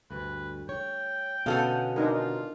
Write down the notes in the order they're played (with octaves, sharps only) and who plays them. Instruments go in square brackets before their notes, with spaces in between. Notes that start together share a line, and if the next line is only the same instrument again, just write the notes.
[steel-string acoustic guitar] D2 G2 [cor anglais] B4
[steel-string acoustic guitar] C#5 [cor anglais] G5
[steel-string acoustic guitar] B2 D3 C#4 [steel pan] B3 A4 [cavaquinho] F5 F#5 G#5
[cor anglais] G#3 [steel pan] D4 D#4 A#4
[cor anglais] F4